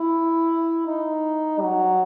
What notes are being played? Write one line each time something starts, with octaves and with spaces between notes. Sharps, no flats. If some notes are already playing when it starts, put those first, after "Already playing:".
Already playing: E4
D#4
F#3